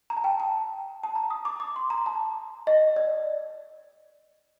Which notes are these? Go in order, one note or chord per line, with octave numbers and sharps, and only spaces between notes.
A#5
A5
G5
A5
A5
A#5
D#6
D6
D6
C6
A#5
A5
D#5
D5